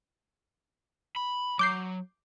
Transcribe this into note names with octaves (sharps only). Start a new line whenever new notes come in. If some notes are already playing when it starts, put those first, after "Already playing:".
B5
F#3 D6 G6 C7